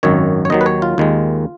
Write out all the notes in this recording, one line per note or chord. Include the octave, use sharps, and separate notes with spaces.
G#1 F#2 D#3 C#5
C#5
D#2 D#3 F#3 D#5
B4
C#5
F4
D#2 D#3 G#3